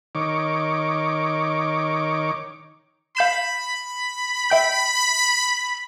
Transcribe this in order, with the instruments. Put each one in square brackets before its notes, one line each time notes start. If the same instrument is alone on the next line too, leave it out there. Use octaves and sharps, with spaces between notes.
[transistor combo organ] D#3 C#5 D6
[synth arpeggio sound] F5 G6 E7 [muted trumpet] B5
[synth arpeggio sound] E5 G5 G6